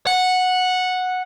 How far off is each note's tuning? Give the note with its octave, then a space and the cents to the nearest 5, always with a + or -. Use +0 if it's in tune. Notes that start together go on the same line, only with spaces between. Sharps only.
F#5 -10